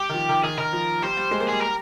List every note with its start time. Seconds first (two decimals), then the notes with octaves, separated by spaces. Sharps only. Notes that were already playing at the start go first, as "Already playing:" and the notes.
Already playing: G3 G4
0.09 D#3
0.14 F3
0.29 D#3
0.43 D#3 G#4
0.57 D#3 A#4
0.73 F3
1.02 G3 C5
1.17 G3
1.31 G#3
1.40 A#3
1.49 G3 G#4
1.60 A#4